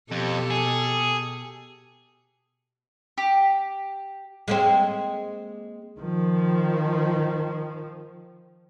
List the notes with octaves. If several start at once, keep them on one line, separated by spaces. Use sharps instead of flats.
F2 B2 G4 A4
G#4
G4
G#3 A#3 C4
D#3 F3